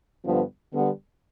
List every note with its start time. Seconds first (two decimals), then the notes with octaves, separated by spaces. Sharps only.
0.24 G2 D3 F3 B3
0.72 D3 G3 B3